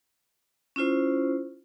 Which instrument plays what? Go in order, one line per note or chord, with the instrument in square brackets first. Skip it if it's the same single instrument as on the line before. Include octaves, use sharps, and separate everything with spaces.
[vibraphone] C#4 E4 F4 C5